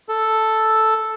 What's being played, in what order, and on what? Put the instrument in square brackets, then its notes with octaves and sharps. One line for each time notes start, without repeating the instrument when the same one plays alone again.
[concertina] A4